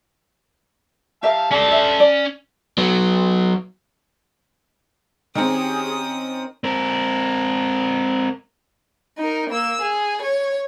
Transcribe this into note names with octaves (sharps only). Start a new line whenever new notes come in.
G4 A#4 E5 F5 A5
C#4 A4 D5 A5 C6
G#4 E5
D5
F#3 B3
D#3 C4 C#4 G4 G#4 D#6
C4 A#4
D#4 A#4
A#3 E6
G#4
C#5